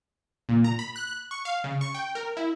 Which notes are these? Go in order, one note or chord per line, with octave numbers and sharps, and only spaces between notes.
A#2
A#5
B5
F#6
F#6
C#6
F5
C#3
C#6
G5
A#4
E4